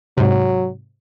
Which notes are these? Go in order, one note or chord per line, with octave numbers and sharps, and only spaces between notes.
G#2 C3 F#3